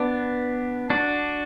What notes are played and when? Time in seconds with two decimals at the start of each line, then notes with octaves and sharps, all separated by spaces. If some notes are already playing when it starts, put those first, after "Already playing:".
Already playing: B3 D4
0.90 D4 F#4